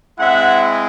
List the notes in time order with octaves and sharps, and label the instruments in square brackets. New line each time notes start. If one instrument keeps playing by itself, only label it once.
[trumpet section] G#3 C4 E4 E5 F#5